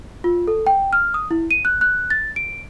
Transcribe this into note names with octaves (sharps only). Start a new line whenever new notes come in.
F4
A4
G5
F6
D#6
E4
D#7
F#6
F#6
A6
D7